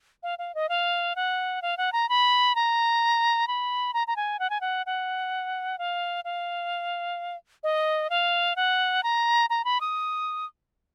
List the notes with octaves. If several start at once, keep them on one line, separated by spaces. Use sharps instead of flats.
F5
F5
D#5
F5
F#5
F5
F#5
A#5
B5
A#5
B5
A#5
A#5
G#5
F#5
G#5
F#5
F#5
F5
F5
D#5
F5
F#5
A#5
A#5
B5
D#6